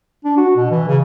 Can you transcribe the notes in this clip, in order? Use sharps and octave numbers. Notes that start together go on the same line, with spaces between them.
D4
F#4
B2
E3
C#3